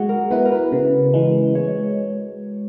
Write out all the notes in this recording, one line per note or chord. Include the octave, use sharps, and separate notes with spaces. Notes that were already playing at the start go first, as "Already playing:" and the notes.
Already playing: G#3 F#4 G#4
A#4
B3 E4 B4
A#4
B4
C#3
E3 G#3
G#3 C#5